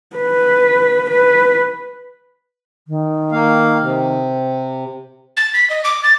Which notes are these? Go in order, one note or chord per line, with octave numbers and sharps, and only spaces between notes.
B4
B4
D#3
A#3 F5
C3
A6
B6
D#5
D6
A6